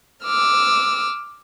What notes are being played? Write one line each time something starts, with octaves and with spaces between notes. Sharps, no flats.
D6 E6 F6